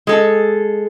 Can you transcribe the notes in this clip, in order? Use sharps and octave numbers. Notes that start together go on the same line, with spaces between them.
G#3 A4